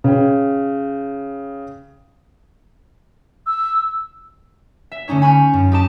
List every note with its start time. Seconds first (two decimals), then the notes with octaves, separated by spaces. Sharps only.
0.04 C#3 G5
3.46 E6
4.92 E5
5.08 D3 A3 C#4 D#4 C#5
5.22 G#5 B5 C#6 F6 G6
5.54 F#2
5.72 D#4 G4 A5